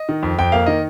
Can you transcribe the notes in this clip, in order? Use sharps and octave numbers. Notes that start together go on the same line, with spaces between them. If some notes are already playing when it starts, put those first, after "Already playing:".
Already playing: D#5
D#3
F2
F2 G5
A#3 F5
D#3 D#5